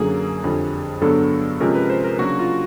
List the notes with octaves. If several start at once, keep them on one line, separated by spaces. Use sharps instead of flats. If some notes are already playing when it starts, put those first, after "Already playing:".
Already playing: F#2 D3 F#3 A#3 G#4
F2 D3 G3
G2 D3 F#3 B3 D4 A4
C3 F3 G#3 C#4 A#4
B4
C5
A#4
C#3 F#3 A#3 D4 F#4
F4